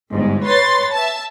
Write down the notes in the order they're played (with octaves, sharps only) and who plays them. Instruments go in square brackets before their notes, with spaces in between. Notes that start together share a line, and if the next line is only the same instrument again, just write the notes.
[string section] G1 G#2
B4 C#5 C6 A6
E5 A5